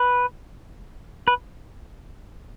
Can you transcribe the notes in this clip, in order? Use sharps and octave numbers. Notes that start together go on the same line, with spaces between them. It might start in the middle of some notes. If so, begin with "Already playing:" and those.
Already playing: B4
B4